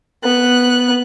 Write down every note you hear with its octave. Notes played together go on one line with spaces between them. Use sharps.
B3 F#6